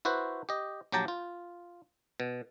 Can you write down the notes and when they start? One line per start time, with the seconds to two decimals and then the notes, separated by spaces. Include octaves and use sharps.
0.05 E4 F#4 B4 C5
0.49 G4 D#5
0.92 A#1 F#3 G4 G5 A5 A#5
1.08 F4
2.20 B2